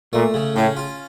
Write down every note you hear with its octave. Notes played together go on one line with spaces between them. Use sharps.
A#2 A3
C#3
A2 C#4
F4